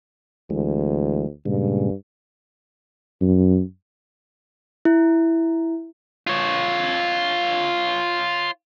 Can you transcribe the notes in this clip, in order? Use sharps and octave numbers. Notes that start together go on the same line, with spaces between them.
D2 E3 G#3
G2 A#2 C#3 G#3
F#2
E4
F4 C#5